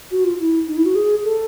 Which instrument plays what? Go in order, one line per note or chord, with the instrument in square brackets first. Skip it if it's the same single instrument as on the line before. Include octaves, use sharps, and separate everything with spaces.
[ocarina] F#4
F4
E4
D#4
E4
F#4
G#4
A4